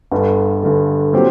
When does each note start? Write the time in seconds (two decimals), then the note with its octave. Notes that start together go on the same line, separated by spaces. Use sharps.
0.12 G1 G2 D3
0.63 G1 G2 D3
1.13 A#2 F#3 C4 G4